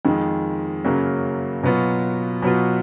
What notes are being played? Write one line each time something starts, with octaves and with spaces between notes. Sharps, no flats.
F2 D#3 G#3
F#2 C#3 F#3 A#3
B2 F#3 B3 F4
B2 F#3 B3 F4